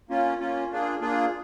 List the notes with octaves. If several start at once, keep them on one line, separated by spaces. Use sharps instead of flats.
A#3 C#4 F4
A#3 C#4 F4
A#3 D4 F4 G#4
A#3 D4 F4 G#4